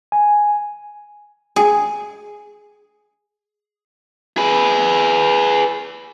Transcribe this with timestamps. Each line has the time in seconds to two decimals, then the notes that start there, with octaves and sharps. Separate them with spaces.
0.12 G#5
1.56 G#4
4.37 G#4 B4